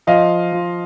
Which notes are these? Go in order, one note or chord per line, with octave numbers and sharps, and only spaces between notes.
F3 D#5 F5
F3